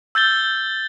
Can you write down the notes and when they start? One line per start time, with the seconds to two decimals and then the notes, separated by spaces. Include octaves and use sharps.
0.15 E6 G6 A6 G7